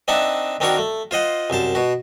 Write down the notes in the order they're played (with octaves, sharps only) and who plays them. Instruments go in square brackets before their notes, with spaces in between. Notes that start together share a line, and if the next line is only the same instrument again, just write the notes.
[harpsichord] C4 D4 D#4 E5 F#5 A5
D#3 C4 D4 F#4 A#4 C#6
A3
F4 C5 D#5 F#5
C2 F#2 C5 A5
B2 F#4